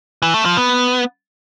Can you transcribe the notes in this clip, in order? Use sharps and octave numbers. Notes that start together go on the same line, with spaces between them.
E3
A3
F3
B3